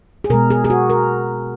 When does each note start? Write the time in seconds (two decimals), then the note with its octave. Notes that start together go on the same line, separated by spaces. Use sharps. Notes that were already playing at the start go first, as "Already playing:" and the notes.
0.24 G#4
0.30 B2 A#4
0.34 G#3
0.50 G#4
0.64 G#4
0.70 F#4
0.90 A#4